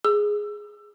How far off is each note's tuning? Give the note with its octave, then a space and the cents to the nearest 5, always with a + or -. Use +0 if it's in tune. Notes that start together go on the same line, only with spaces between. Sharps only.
G#4 +0 E6 +20